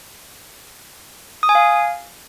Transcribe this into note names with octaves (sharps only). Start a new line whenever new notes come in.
D#6
G#5
F5